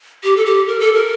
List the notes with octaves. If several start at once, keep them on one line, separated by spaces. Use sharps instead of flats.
G4
A4
G4
A#4
A4
A#4